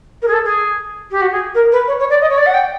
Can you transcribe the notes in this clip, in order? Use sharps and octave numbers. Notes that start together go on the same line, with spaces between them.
A#4
G#4
A4
G#4
G4
F#4
G#4
A#4
B4
C#5
C#5
D5
D#5
C#5
D5
F#5
G5